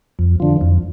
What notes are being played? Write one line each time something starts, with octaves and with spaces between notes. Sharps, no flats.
F2
D3 F3
F2